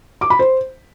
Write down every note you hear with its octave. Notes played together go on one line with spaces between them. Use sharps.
D6
B5
C5